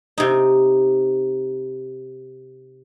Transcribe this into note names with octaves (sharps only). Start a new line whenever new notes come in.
C3 D#4